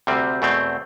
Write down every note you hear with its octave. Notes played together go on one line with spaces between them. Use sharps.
D2 C3 G3 C4
E2 B2 A3 C4